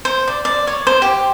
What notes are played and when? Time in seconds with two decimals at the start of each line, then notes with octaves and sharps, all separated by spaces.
0.05 C5
0.28 D5
0.45 D5
0.67 C#5
0.87 C5
1.02 G4